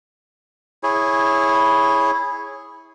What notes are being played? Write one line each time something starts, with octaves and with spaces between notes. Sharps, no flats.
E4 G#4 C#5